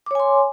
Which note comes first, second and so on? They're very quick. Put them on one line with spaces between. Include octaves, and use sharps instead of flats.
D6 C#5 G#5 C6